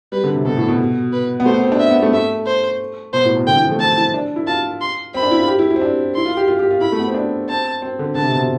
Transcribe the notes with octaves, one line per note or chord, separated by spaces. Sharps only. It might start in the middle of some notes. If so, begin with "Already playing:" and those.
G3 B4
D3
C3
B2 A4
A2
B2
B4
B3
A3 C5
B3
C4
D4
E5
B3
A3
A3 E5
C5
B2 C5
A2
B2
D3 G5
E3
F3
A3
C4 A5
E4
D4
E4
F4 A5
C6
C4 B5
D4
E4
F4
G4
E4
E4
C4
D4
E4 C6
F4
G4
F4
G4
F4
E4 B5
A3
B3
C4
D4
C4 A5
C4
D3
D3 A5
C3
B2
C3